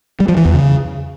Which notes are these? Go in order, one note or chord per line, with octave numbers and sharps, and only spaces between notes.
G3
F3
E3
E2
C#3